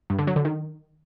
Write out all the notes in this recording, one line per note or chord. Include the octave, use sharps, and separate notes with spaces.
G2
D3
F#3
D3
D#3